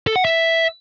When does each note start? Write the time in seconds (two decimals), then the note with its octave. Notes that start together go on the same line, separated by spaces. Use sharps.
0.07 A4
0.16 F#5
0.25 E5